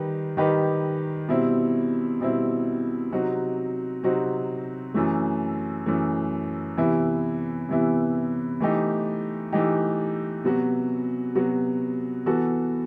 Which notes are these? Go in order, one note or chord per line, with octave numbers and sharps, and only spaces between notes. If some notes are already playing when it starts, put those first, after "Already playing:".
Already playing: D#3 G3 D#4 G4 B4
D#3 G3 D#4 G4 B4
B2 G3 C4 E4
B2 G3 C4 E4
C3 F#3 C4 D#4 F#4
C3 F#3 C4 D#4 F#4
F#2 E3 A3
F#2 E3 A3
C3 E3 B3 E4
C3 E3 B3 E4
E3 A3 D#4 G4
E3 A3 D#4 G4
C3 F#3 B3 F#4
C3 F#3 B3 F#4
E3 B3 F#4 A4